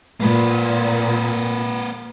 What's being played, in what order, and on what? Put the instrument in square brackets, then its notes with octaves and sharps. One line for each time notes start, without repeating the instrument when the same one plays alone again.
[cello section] A#2 [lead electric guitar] A#3 B4